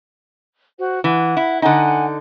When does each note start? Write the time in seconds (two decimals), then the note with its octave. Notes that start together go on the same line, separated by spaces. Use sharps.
0.79 F#4 C5
1.04 E3 F#5
1.37 E4
1.62 D3 D#4 F#5 G#5